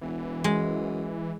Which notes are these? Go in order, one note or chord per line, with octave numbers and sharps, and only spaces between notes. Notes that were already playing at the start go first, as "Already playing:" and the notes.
E1 E3
F#2 G#3